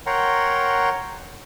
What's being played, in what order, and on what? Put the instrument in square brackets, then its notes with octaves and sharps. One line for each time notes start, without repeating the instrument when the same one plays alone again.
[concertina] A#4 C#5 F#5 G5 A#5 C6